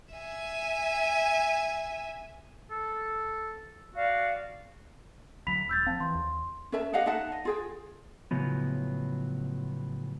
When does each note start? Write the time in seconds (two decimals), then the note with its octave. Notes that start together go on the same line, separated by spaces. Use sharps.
0.15 E5 G#5
2.71 A4
3.95 F#4 D5 F5
5.47 D2 F#3 B5 B6 F7
5.69 E1 E6 G6 A6
5.87 F3 C4 F5 A5
6.00 E3 C6
6.15 D#2
6.72 C#4 A#4 E5 A5
6.93 G4 D#5 F5 F#5
7.06 D#4 E5 F#5 A5
7.32 D#5
7.45 F4 G#4 G5
8.31 A2 C#3 F3 F#3 B3